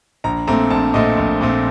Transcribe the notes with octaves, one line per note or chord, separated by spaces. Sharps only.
A#1 A#5
A#2 A3 C4 A#5
A#1 A5
A#2 A3 C4 D#5
A#1
A#2 A3 C4